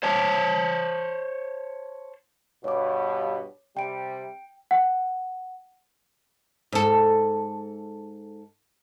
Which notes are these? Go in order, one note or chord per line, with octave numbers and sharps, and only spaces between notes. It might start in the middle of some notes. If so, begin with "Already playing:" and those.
C5 C#5 A5
G2 B2 C#5 D6
C3 G3 G5 D7
F#5
G#2 A4